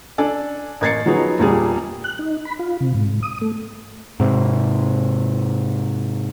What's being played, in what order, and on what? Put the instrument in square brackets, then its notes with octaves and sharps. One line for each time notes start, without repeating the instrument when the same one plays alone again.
[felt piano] D4 A4 D5 G#5
A1 A#3 G#6 A6 C7 C#7
F3 F#3 B3 D#4 G#4 C#5
E1 A#2 G3 G#4
[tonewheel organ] F#6
D#4
B5
F4
C3
G#2
D#6
A3
[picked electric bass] G#2 C3